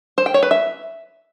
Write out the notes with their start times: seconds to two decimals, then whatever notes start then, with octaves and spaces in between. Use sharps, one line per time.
0.18 C5
0.26 G5
0.34 C#5
0.43 B4
0.51 E5